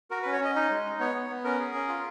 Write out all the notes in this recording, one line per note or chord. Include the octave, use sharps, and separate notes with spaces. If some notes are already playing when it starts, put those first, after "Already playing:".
F#4 A#4
B4
C#4
C#5
C#4 D#5
D#4 D#5
G#3
D#4
B3 C#5
B3
B3
C#4 A#4
G#4
C#4
F4